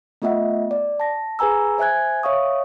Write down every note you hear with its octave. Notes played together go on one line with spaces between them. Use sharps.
A3 B3 F4 D#5 E5 F#5
D5
A5 A#6
G#4 B4 G#5 A#5 E6
C5 E5 G#5 F#6 G#6
C#5 E5 F5 C#6 D#6